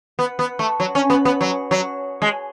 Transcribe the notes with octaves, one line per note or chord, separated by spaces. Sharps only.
B3
B3
A3
F#3
C#4
B3
B3
F#3
F#3
G#3